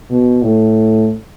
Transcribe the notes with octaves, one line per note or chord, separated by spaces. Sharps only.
B2
A2